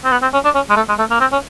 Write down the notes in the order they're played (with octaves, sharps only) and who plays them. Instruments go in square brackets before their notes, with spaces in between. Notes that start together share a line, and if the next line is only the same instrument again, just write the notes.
[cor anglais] C4
B3
C4
C#4
D4
C#4
G#3
A3
G#3
A3
A#3
C4
C#4